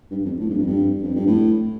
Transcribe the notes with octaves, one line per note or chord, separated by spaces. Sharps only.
G2
F2
A2
G2
F2
G2
F2
G2
A2